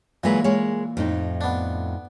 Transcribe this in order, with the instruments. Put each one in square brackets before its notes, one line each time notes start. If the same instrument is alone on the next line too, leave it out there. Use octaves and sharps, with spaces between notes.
[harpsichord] A#2 E3 A#5 [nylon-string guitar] F#3 G#3 B4
[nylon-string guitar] G#3 A#4 C#5
F2 A2 D#4
[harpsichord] B3 D4